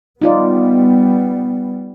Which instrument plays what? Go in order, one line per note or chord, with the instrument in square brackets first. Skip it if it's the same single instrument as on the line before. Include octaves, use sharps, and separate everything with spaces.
[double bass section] G3 B3 [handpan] D#4 F4 D5